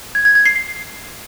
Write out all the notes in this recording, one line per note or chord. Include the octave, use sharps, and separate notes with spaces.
G#6
G#6
G#6
C7
C7